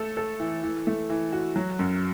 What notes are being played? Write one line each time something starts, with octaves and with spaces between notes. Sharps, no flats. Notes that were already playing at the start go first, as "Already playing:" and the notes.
Already playing: A3 A4
A4
E3
E3
A3
E3
F#4
F#3
F#2